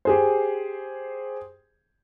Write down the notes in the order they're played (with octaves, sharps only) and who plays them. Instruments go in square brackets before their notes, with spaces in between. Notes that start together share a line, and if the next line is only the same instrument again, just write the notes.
[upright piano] G4 G#4 C5